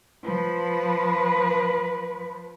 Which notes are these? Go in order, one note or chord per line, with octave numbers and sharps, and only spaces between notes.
F3 B4